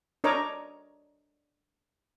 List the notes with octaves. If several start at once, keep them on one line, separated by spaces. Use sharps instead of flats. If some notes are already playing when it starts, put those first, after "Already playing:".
D4 A#4 C#5 D#5 A#5 D6